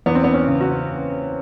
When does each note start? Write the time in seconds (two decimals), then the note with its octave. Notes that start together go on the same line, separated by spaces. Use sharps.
0.06 E2 B3
0.15 C4
0.24 B3
0.33 C#4
0.47 C#3
0.61 F#4